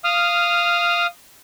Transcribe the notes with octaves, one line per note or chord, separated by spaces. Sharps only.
F5 D#6 F6